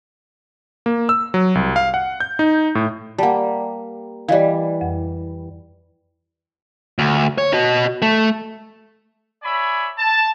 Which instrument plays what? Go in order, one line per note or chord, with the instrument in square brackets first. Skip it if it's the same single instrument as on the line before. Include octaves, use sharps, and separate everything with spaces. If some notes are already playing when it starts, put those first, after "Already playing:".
[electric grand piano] A#3
E6
F#3
C2
F5
F#5
G6
D#4
A2
[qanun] G3 A#3 [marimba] F#5 A5
[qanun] E3 G3 [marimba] D5 D#5 F5
[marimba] F2
[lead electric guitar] D2
C#5
F#4 D#5
A3
[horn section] C#5 D5 E5 G#5 B5
A5